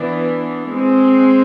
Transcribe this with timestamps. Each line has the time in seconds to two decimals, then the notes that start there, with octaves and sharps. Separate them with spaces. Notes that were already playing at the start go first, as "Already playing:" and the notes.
Already playing: E3 B3 D4
0.71 G#3 C4